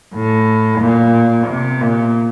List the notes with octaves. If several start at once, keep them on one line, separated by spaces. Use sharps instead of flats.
A2
A#2
C3
A#2